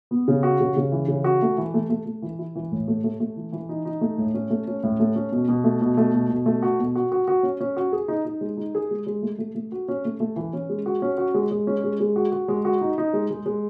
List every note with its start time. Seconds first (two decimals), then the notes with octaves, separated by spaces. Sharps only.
0.11 B3
0.28 C#3
0.43 F#4
0.61 C#3
0.76 C#3
0.92 E3
1.08 C#3
1.24 F#4
1.42 A3
1.58 E3
1.74 A3
1.90 A3
2.06 A3
2.22 E3
2.39 E4
2.56 E3
2.72 A2
2.88 A3
3.04 A3
3.20 A3
3.36 E3
3.52 E3
3.69 D#4
3.85 D#4
4.01 A3
4.18 A2
4.34 C#4
4.50 A3
4.68 C#4
4.83 A2
5.00 A3
5.16 C#4
5.32 B2
5.49 B2
5.64 A3
5.82 B2
5.97 A3
6.14 B2
6.29 B2
6.46 A3
6.63 F#4
6.79 B2
6.96 F#4
7.12 F#4
7.28 F#4
7.43 C#4
7.60 C#4
7.77 F#4
7.92 G#4
8.08 D#4
8.25 D#4
8.41 G#3
8.57 D#4
8.75 G#4
8.91 G#3
9.07 G#3
9.22 A3
9.39 A3
9.55 A3
9.72 F#4
9.88 C#4
10.05 A3
10.20 A3
10.36 E3
10.53 C#4
10.69 G#3
10.86 F#4
11.02 C#4
11.18 F#4
11.34 G#3
11.51 G#3
11.67 C#4
11.84 G#3
12.00 G#3
12.16 F#4
12.32 F#4
12.48 G#3
12.65 F#4
12.81 D#4
12.98 D#4
13.13 G#3
13.31 G#3
13.46 G#3